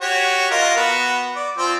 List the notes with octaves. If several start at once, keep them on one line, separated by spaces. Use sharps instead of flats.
F#4 G4 C#5
F4 A#4 D#5
B3 F#4
D5
F3 C4 C6